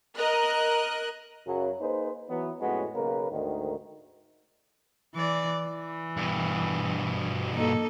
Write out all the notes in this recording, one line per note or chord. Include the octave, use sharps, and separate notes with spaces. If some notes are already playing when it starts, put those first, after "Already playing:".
A#4 D#5 F#6
F#2 C#3 F#3
A#3 D#4 G#4 B4 C5
E3 F#3 B3
F2 A2 G#3 B3 C#4 F#4
B1 C#3 A#3 A#4 B4
D2 G#2 D#3
E3 D5
E3
G2 B2
A#3 D#4 A4